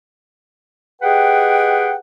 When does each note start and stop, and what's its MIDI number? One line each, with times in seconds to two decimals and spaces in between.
1.02 1.96 67
1.02 1.96 68
1.02 1.96 71
1.02 1.96 75
1.02 1.96 78
1.02 1.96 79